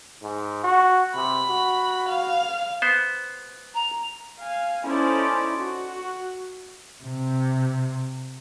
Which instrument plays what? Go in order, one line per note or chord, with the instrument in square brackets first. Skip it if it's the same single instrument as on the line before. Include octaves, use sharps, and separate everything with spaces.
[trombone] G#2
F#4
[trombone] C3 [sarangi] B5
[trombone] F#4
[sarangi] F5
[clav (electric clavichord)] B3 C5
[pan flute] A#5
[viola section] F5 G#5
C#4 D#4 E4 A4 C5 D5
F#4
[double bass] C3